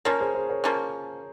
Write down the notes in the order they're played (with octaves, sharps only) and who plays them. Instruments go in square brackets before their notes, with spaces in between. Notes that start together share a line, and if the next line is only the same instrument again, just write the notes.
[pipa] F3 A#3 C#4 [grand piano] A#4 C#5
[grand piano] G#4 C5
G#4 C5
A#4 C#5
[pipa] F3 A#3 C#4